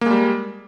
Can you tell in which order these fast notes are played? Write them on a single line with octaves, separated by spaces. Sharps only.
A#3 G#3 G3